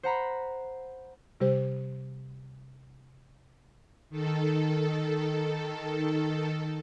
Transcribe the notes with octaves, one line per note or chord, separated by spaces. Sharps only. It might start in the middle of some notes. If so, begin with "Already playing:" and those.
C5 F#5 A#5 B5
C3 G3 G4 C5
D#3 A4